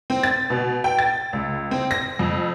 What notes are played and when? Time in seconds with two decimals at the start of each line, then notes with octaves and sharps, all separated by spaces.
0.10 C4
0.23 A6
0.50 B2
0.84 G5
0.99 A6
1.33 C#2
1.71 C4
1.91 A#6
2.19 F2